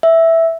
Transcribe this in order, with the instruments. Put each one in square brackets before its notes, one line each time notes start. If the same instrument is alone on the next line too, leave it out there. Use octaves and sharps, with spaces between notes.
[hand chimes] E5